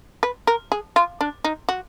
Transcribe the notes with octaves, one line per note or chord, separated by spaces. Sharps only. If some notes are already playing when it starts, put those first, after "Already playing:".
B4
A#4
G#4
F4
D4
D#4
F#4